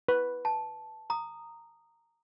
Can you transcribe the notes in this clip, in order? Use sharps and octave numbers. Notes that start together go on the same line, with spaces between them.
B4
A5
A#5 D#6